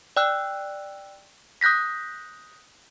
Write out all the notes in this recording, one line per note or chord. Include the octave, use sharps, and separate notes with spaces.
D5 G5 E6 F#6
D#6 F#6 G6 A#6 B6